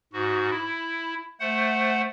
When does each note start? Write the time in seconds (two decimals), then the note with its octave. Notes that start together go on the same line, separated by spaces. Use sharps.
0.13 G#2 F#4
0.50 E4
1.40 A3 C5 F#5